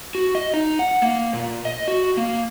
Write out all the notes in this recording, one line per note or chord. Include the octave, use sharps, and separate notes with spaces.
F#4
D#5
D#4
F#5
A#3
A#2
D#5
F#4
A#3